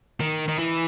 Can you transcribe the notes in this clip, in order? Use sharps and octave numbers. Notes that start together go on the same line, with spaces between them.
D#3
D#3
E3